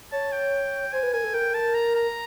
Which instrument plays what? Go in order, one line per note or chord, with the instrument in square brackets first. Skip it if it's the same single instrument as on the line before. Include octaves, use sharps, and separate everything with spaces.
[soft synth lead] C#5 [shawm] A5
[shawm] G5
[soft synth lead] C5 [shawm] G#5
[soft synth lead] B4
[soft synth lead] A#4 [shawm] G#5
[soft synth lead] A4
[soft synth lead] A#4 [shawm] G5
[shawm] A5
A#5
A#5